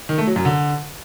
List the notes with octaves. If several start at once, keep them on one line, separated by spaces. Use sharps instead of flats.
D#3
A3
F#3
F#2
D3